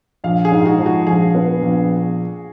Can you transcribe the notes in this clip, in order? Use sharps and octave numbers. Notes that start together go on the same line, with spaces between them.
A#1 F5
G#4
G#2
F#4
F3
F#4
A#1 G#4
B3
A#1